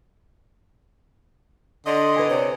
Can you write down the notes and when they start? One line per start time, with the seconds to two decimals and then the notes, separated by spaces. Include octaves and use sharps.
1.86 D3 D#5 C6
2.16 B4 G#5
2.30 C3 C#5